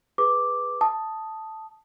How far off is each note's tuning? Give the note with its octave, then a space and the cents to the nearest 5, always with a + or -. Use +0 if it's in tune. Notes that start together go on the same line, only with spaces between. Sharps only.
G#4 +0 B4 +0 D6 +0
A5 +0 D#6 +0